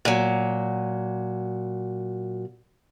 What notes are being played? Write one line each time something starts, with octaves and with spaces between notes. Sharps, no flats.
A#2 F#3